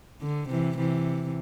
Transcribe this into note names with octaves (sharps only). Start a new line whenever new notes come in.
D3
C3 E3
C3 E3